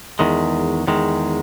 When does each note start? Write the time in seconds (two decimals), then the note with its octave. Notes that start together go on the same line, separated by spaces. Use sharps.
0.19 E2 D#3 G#3
0.87 E2 D#3 G#3